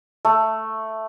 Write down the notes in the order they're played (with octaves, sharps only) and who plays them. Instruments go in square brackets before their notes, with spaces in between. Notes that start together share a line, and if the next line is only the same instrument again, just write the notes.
[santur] A3